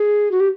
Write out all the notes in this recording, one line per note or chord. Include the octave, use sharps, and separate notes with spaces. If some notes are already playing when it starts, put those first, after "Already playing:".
Already playing: G#4
F#4
G4